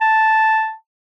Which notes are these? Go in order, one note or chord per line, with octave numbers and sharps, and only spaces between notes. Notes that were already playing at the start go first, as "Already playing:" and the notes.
A5